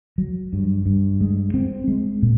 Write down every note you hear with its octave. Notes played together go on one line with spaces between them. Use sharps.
F#3
G2
G2
G#3
C4
G#3
A#2